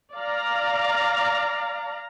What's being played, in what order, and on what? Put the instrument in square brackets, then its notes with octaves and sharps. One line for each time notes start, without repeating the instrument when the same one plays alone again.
[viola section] D5 F5 A#5